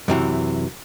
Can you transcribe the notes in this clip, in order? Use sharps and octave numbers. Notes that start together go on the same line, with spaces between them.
F#2 C3 E3